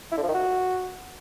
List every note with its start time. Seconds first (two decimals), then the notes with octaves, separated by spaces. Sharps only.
0.12 E4
0.17 D3
0.23 F3
0.29 D#3
0.34 F#4